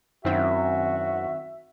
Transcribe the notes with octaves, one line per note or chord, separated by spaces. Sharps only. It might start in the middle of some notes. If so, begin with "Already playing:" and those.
F#2 D#3 C4 E4 F#4 E5